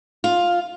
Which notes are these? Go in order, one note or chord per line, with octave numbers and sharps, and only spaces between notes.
F4